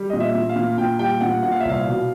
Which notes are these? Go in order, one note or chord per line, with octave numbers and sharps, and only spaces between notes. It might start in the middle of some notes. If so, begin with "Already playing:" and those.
Already playing: G3
A#2 D#5
E5
A#2
F5
A#2
A#2 G5
G3 G5
A#2 F#5
A#2 F#5
F5
E5
C2 F5
B2